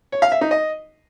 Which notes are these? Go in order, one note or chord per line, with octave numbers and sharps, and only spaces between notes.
C#5
F5
E5
D#4
D#5